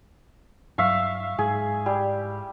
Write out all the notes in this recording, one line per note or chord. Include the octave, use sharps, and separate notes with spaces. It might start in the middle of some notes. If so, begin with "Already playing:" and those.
G2 F#3 E5 F5 C#6
G#2 G#4
G3